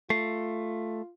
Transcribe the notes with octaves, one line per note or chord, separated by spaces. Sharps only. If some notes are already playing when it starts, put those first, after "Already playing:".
A3 F4 C7